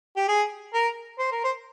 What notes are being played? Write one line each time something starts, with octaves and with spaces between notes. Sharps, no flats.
G4
G#4
A#4
C5
A#4
C5